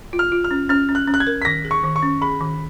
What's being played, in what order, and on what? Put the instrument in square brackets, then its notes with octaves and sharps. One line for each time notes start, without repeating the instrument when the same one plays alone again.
[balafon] F4
[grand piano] F6
[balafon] F4
[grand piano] F6
[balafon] C#4
[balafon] C#4 [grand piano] F6
[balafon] C#4
[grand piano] F#6
[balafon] C#4
[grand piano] F#6
G#6
[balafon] A#4
[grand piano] B6
[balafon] D#3 [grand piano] A#6
[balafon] G#4
[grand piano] C#6
[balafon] D#3
[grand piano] C#6
[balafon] C#4
[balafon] G#4 [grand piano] B5
[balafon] D#3